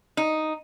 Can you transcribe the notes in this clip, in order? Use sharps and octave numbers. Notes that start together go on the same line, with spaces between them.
D#4